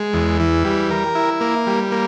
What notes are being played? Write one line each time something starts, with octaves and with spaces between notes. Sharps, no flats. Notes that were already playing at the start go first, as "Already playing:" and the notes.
Already playing: G#3
E2
E3
G3
A#4
E4
A#3
G3
A#3